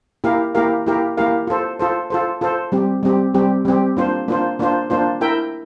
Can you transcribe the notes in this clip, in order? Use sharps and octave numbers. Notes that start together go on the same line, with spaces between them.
A#3 E4 G4 A#4 F5
A#3 E4 G4 A#4 F5
A#3 E4 G4 A#4 F5
A#3 E4 G4 A#4 F5
F4 A4 C5
F4 A4 C5
F4 A4 C5
F4 A4 C5
G3 C4 G4
G3 C4 G4
G3 C4 G4
G3 C4 G4
A#3 D4 F4 C5
A#3 D4 F4 C5
A#3 D4 F4 C5
A#3 D4 F4 C5
E4 A#4 E5 G5